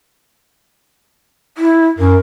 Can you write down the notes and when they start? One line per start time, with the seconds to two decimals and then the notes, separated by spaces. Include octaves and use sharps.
1.58 E4
1.99 F#2 A#4